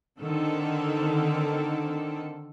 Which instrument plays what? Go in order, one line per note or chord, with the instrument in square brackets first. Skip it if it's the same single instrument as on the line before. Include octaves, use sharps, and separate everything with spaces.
[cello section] D3 D#3 C4 A4